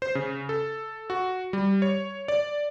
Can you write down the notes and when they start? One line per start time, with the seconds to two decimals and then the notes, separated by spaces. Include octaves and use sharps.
0.02 C5
0.15 C#3
0.49 A4
1.10 F#4
1.53 G3
1.82 C#5
2.28 D5